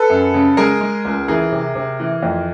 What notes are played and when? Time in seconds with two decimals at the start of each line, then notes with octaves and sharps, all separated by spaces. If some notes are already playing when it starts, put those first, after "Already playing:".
Already playing: A4 B4
0.10 F#2
0.34 C#3
0.57 G#3 G#4 A#4
0.81 G#3
1.05 C#2
1.28 E3 G#4 A#4
1.52 C3
1.75 C3
2.00 E3
2.23 F2